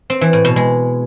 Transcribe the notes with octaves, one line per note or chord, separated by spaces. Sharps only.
C4
E3
A2
B2
G#3